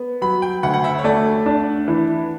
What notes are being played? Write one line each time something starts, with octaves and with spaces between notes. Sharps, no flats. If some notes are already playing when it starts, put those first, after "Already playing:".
Already playing: B3
F#3 B5
G5
D2 F#5
F#5
E5
C#5
A3 D5
D4
E3